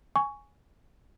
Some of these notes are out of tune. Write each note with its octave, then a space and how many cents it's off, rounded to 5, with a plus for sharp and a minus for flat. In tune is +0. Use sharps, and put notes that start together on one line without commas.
G#5 +0 C#6 +15